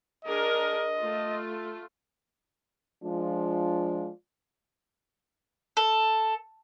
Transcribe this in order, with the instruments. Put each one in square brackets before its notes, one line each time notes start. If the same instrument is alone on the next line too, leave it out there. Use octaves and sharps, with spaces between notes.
[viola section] D4 G#4 A#4 [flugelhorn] D#5
[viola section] A3 F4
[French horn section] F3 G#3 D4 F4
[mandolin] A4